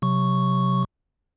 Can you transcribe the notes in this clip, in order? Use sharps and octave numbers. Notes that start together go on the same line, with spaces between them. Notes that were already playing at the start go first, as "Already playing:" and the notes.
C3 F#3 C#6